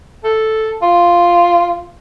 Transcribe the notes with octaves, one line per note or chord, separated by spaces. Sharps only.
A4
F4